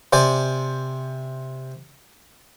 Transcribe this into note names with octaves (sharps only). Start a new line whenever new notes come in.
C3 C5 D5 G#5